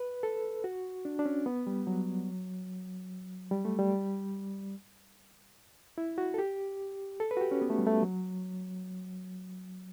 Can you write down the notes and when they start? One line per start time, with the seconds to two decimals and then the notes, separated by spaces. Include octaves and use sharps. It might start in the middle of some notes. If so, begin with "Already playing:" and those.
Already playing: B4
0.23 A4
0.64 F#4
1.05 D4
1.19 D4
1.25 C#4
1.46 B3
1.67 G3
1.87 F#3
3.51 G3
3.65 A3
3.79 G3
5.98 E4
6.18 F#4
6.34 A4
6.38 G4
7.20 A4
7.31 B4
7.37 F#4
7.41 G4
7.51 C#4
7.62 B3
7.70 A3
7.78 G3
7.87 A3
8.02 F#3